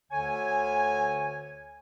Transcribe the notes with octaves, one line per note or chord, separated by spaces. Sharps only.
D2 D3 C#5 G#5